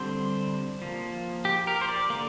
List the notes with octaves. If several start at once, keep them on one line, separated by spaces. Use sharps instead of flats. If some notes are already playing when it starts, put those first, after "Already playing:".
Already playing: D3 G3 C4 C5
F3 A#3
G4
A#4
C5
D5
D3 A#3